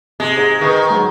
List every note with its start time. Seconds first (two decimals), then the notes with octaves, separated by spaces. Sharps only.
0.20 C3 G#3
0.37 G#2
0.61 D#3 B4 D#5 C#6
0.90 F#3 G#3